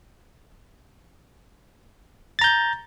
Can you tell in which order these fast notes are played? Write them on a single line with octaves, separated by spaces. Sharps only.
A6 A#5 G6